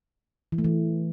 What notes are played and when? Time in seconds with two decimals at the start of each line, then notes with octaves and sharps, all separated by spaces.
0.52 E3
0.58 A3
0.64 E3